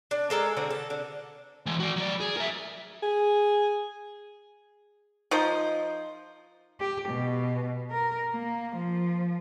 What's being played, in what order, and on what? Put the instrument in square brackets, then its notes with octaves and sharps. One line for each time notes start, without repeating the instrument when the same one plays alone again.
[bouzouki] D4
G#3 A4 A#4 F5
D3 C4 F#4
A4
D3
[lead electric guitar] E3 G#3
F#4 D5
F#3 D5
G#4
A#4 E5
[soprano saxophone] G#4
[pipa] F3 D#4 C5
[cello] G4
B2
A#4
A#3
F3